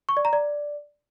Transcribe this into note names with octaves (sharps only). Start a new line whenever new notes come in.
C#6
D5
A#5
D5